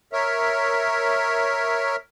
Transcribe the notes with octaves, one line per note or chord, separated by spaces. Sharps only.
A#4 C#5 E5